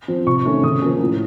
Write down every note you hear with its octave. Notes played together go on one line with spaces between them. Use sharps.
F3 C4
C3 C#6
D#3 A3 C#4
C#3 D#6
F3 A#3 C#4
A2